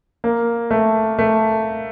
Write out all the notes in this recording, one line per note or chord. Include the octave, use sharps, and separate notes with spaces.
A#3
A3
A3